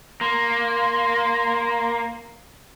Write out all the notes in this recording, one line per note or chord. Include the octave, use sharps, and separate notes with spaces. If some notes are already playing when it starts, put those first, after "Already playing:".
A#3 C6